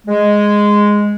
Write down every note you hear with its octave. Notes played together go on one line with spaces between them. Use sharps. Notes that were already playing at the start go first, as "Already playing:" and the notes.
G#3